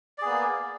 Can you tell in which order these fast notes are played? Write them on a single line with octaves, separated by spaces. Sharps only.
D5 G#4 B3 A#3